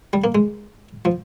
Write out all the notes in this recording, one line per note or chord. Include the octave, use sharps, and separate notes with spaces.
G3
A#3
G#3
F3